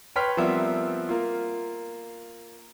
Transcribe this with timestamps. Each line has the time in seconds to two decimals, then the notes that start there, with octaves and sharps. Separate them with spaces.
0.16 B4 C#5 G5 C6 F6 B6
0.37 F3 G3 B3 C4 A#4 E5
1.09 A#3 F4